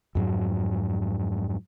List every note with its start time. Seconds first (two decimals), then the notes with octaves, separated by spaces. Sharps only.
0.15 F2 G#2 F#3